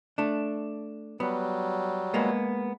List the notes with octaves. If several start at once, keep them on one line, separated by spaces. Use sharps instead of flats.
A3 D4
F#3 G3 B3
G#3 A#3 B3